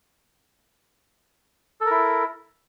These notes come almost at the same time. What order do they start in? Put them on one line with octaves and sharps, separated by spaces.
A4 A#4 E4